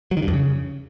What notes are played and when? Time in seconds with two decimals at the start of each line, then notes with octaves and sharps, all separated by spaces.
0.11 F#3
0.17 D#3
0.22 G2
0.28 F2
0.33 C#3